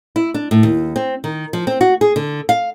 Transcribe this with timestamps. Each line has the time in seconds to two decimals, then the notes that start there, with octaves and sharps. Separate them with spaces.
0.16 E4
0.34 D4
0.51 A2
0.63 D#2
0.96 C4
1.24 D#3
1.53 F3
1.67 C4
1.81 F#4
2.01 G#4
2.16 D3
2.49 F5